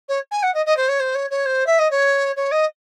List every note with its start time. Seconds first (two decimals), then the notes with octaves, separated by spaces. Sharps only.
0.08 C#5
0.31 G#5
0.43 F#5
0.54 D#5
0.66 D#5
0.77 C5
0.88 C#5
1.00 C5
1.15 C#5
1.30 C#5
1.46 C5
1.66 E5
1.79 D#5
1.91 C#5
2.36 C#5
2.51 D#5